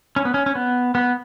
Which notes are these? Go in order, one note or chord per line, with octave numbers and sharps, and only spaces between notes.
C#4
B3
C#4
C#4
B3
B3